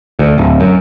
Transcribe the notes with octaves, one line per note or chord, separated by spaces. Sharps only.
D2
D1
F#2